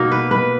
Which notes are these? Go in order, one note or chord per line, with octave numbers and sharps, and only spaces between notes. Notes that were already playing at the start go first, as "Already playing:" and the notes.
Already playing: B2 A#3 D#4
B4
B4